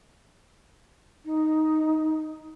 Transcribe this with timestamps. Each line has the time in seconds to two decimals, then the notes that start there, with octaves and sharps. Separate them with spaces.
1.25 D#4